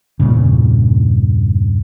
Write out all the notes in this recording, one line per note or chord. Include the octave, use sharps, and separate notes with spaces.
E2 G2 A#2 C#3